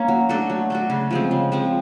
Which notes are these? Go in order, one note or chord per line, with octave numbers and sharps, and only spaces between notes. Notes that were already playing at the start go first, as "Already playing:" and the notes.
Already playing: A#3 C#4
F#3
A3 D4 F#4
F#3
A3 D4 F#4
C#3
F3 G#3 C4
C#3
F3 G#3 C4